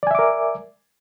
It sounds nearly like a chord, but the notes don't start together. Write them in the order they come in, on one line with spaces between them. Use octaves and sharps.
D5 G#5 E5 D6 A#4